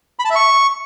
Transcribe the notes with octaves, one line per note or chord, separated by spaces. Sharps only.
B5
A5
E5
C#6